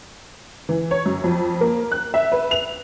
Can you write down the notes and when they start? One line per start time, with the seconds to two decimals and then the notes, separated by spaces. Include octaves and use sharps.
0.69 E3
0.91 C#5
1.06 F#2
1.24 F2
1.61 A#3
1.92 F#6
2.14 E5
2.32 B4
2.51 F7